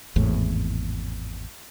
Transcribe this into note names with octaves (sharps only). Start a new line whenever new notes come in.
G#1 E2 A2